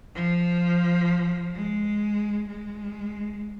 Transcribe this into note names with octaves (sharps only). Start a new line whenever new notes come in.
F3
G#3
G#3